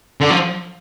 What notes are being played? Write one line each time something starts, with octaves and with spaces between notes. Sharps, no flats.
D3
F3